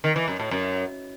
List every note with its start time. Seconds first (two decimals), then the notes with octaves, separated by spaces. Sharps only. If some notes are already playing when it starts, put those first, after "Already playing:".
0.04 D#3
0.16 E3
0.28 F#2
0.39 A2
0.51 F#2